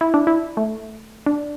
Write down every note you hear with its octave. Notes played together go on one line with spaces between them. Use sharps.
E4
D4
E4
A3
D4